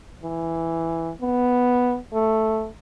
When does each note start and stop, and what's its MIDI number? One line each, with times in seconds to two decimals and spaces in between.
0.23 1.11 52
1.21 1.98 59
2.13 2.69 57